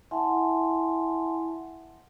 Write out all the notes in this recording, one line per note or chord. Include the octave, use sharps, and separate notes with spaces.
E4 E5 F#5 G#5 A5 C6